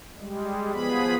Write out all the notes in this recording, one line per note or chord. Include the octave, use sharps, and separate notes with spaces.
G3 G#3
F3 B3 G#4 B5